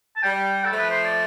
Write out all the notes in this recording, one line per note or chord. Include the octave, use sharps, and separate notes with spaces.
A5
G3 G5
A4
F3 A3
B4
C5
D5